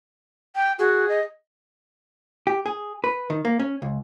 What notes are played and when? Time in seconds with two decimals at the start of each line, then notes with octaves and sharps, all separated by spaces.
0.56 G5
0.79 F#4 G#4
1.09 D#5
2.47 G4
2.66 G#4
3.04 B4
3.30 D#3
3.45 A#3
3.59 C#4
3.82 C#2